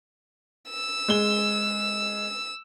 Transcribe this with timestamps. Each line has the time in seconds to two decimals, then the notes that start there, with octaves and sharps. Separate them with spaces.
0.70 E6
1.08 G#3 G7